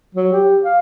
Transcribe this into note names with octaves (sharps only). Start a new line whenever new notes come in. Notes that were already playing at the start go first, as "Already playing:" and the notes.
F#3
G4
F5